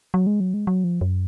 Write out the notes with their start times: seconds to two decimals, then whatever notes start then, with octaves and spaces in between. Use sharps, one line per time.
0.14 F#3
0.27 G#3
0.40 F#3
0.54 G#3
0.67 F#3
0.84 F3
1.01 F#2